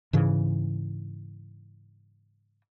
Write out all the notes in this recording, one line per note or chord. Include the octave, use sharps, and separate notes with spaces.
G#2 C#3 E3